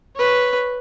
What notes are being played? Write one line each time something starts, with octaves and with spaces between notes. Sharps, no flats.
B4 C#5